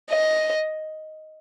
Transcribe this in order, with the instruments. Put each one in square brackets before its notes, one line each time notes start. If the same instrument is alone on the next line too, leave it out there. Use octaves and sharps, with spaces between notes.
[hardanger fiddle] D#5